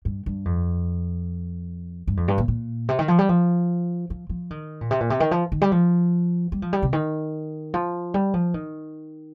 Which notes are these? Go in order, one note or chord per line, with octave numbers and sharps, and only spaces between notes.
G2
G2
F2
G2
F2
G2
A#2
A#2
C3
D#3
F3
G3
F3
F3
F3
D#3
A#2
C3
A#2
C3
D#3
F3
D#3
G3
F3
G3
F3
G3
C3
D#3
F3
G3
F3
D#3